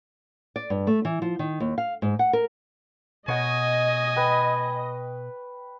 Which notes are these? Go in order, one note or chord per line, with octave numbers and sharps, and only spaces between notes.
D5
G2
A3
E3
F3
D#3
D#2
F5
G#2
F#5
A#4
B2 C#5 D#5 F#5 G#5
B4 G5 B5